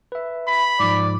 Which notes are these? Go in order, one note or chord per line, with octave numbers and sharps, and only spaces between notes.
B4 E5
B5
G#2 F3 D5